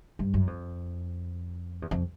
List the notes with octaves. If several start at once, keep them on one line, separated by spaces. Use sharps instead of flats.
G2
F#2
F2
E2
F2